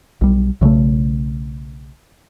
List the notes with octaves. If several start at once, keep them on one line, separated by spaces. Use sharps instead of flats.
B1 G3
B1 C#3 F#3 A3